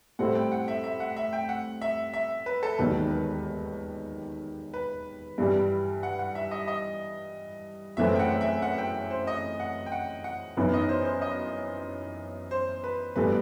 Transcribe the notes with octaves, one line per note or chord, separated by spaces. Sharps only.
A2 G3 C4 E4 F#5
G5
F#5
E5
E5
F#5
E5
G5
F#5
E5
E5
B4
A4
E1 D#2 D#3 F#3 B4
B4
B4
G2 E3 G3
F#5
F#5
E5
D#5
D#5
F#1 F#2 E3 A3 C4 E5
G5
F#5
E5
F#5
G5
C5
D#5
F#5
G5
F#5
F#5
F#2 E3 B3 D#4
D#5
C5
C5
D#5
C5
B4
G1 G2 E3 A3 B4